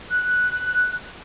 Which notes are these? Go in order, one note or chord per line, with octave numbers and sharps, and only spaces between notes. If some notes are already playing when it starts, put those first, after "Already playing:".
F#6